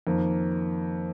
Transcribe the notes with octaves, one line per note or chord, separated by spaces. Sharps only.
F2 D#3 A#3